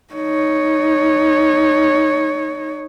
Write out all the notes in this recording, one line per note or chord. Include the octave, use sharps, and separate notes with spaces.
D#4 C#5